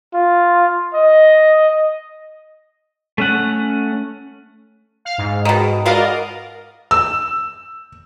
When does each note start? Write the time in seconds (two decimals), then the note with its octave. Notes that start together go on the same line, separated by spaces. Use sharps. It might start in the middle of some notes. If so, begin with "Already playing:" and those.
0.14 F4
0.94 D#5
3.18 A3 C#4 F#5
5.05 F5
5.18 G#2
5.45 B2 D#3
5.86 B2 F#4 A#4 D5 D#5 F5
6.91 E6